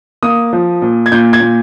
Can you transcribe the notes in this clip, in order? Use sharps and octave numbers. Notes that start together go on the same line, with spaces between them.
A#3 D#6
F3
A#2
G#6
A#2 G6
G#6
A#2